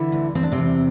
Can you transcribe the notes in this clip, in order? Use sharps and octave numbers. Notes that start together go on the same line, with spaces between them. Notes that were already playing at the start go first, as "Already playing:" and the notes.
Already playing: D3 E3 E4
D2
E2 C4
D4
C3 C4
E2